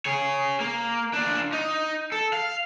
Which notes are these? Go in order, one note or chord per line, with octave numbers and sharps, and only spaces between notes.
G#4 C#5
A#3
D4 F4
D#4
A4
F5